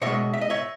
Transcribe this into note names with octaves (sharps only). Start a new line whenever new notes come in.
B2 G#3 C#5 E5
E5
D#5
C#5 E5